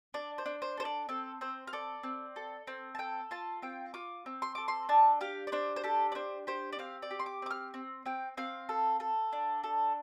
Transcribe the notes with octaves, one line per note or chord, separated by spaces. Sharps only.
D4 D5
C5
D4
C5
A4 C5
D5
C4 A4
C4 C5
F5
A4 D5
C4
A4
C4
A5
A4 G5
F4 A5
C4 G5
F4 D6
C4
C6
A4 D6
C6
D4 A5
G4 F5
D5
D4 C5
C5
G4 A4
D5
D4 C5
G4 C5
D5
C4 F5
D5
G4
C6
D6
C4 D6
F6
C4
C4 G5
C4 F5
A4
A4
D4
A4